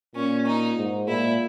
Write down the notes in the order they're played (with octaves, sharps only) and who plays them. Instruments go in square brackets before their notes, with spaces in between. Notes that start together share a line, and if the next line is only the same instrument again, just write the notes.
[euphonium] A#2 [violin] C#4
[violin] D#4
[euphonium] G#2
[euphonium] A#2 [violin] E4